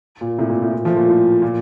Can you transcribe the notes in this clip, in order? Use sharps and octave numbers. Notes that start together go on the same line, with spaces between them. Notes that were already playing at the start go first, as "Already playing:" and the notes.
A#2
A2 C3
A#2
A2
A#2
F3 A3
A#2
A2
A#2